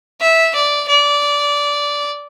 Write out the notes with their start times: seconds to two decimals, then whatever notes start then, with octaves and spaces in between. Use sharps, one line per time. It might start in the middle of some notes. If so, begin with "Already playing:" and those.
0.21 E5
0.55 D5
0.88 D5